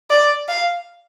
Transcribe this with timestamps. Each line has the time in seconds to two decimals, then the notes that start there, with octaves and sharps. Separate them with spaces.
0.10 D5
0.49 F5